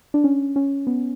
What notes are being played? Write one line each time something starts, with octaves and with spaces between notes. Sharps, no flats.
D4
C#4
C#4
B3